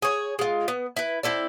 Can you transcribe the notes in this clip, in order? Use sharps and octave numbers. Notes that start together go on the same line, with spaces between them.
G#4 C#5
G#3 F4
B3
E4 B4
C4 E4 A4 D5